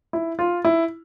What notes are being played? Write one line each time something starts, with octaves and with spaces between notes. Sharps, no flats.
E4
F4
E4